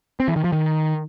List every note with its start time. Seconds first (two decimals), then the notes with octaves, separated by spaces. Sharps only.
0.20 C4
0.28 E3
0.36 D#3
0.44 F3
0.52 D#3